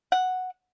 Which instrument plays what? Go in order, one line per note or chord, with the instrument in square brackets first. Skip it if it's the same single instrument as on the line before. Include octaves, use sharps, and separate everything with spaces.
[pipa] F#5